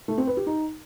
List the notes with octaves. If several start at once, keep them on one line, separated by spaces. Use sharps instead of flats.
A3
C4
B4
G4
D#4